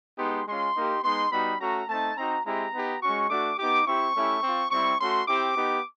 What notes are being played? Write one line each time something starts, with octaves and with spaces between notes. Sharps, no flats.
G#3 B3 D#4 G4 C6
G#3 C#4 F4 C6
A#3 D#4 G4
G#3 B3 D#4 C6
G3 B3 D#4 F#4 B5
A3 C#4 F#4 A#5
A3 C4 D#4 A5
C4 D#4 F#4 A#5
G#3 C4 E4 G4 A#5
B3 D#4 G4
G#3 C#4 F#4 C#6
A3 D4 F#4 D6
B3 D#4 G4 D6
C4 E4 G4 C#6
A3 C#4 E4 G4
C4 F4
G3 C4 E4 C#6
A3 C#4 F#4 C6
C4 E4 G4 D6
B3 D#4 G4